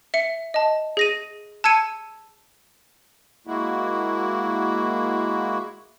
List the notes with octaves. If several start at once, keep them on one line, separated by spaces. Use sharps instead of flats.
E5 C#7
D#5 A5
G#4 A#6 D#7
A5 E6 G#6 C#7 D#7
G#3 A#3 E4 F#4